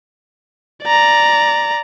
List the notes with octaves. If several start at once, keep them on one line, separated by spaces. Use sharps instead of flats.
D5 A#5